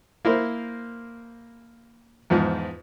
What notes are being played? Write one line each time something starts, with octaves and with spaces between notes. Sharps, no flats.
A#3 E4 A#4 C5
E2 G#2 F3